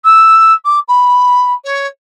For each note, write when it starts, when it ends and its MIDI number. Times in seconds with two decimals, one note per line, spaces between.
0.04 0.53 88
0.65 0.79 86
0.88 1.53 83
1.65 1.87 73